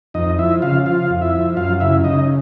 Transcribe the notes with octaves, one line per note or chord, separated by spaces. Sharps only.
F2 D#4 D#5
F3 E4 E5
C#3 F4 F5
F3 F4 F5
F2
E4 E5
F3
F#2 F4 F5
C#3 E4 E5
C#3 D#4 D#5